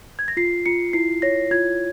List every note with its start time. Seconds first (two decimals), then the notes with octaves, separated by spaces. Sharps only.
0.19 G#6
0.28 A#6
0.37 F4 C7
0.66 F4 C#7
0.93 E4 C7
1.22 C#5 A#6
1.51 F4 G#6